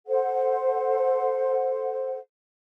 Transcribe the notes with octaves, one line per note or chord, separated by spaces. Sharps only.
A4 C5 F#5